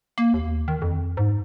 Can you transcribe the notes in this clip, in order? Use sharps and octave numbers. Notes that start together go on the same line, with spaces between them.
A#3
D#2
D#3
F2
G#2